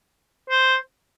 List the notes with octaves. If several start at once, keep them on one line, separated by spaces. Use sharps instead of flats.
C5